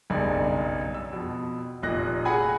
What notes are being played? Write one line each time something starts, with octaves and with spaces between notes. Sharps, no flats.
F#1 B1 G2 C#3 D4 D5
E6
F2 B2
F1 A#2 D#5 F#6 A#6
F#4 G#4 F#5 G#5 B5